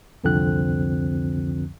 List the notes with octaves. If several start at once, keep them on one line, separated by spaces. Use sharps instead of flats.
C2 F2 D3 F3 C4 F#6